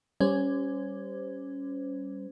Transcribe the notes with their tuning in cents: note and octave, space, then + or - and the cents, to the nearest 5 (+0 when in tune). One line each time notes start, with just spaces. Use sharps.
G3 +0 C#4 +0 C5 -30